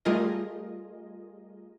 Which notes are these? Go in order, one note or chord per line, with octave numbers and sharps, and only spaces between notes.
G3 A3 F4 G#4 A#4 D#5